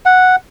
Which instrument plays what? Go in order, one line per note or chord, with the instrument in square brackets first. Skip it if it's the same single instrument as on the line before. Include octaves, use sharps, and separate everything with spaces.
[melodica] F#5